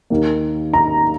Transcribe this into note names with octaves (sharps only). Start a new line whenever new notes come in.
D#2 D#3 A#3
A#5